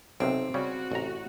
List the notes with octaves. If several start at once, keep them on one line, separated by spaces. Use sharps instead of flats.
B1 C3 D#3 C4
C#3 G3 C#4 F#4
A1 C3 A#5